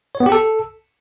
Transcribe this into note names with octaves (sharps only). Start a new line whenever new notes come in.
C#5
B3
G4
A4